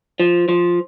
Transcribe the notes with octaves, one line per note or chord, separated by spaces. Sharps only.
F3
F3